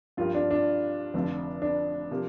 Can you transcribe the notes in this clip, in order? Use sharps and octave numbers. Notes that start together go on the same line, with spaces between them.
G2 F3 A#3 F4 G4 A#4
D4
D4
F1 F2 D3 F3
D4
C3 F3 A#3